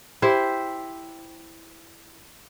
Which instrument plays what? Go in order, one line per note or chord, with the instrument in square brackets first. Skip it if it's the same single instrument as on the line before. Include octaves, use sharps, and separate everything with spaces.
[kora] E4 G4 C5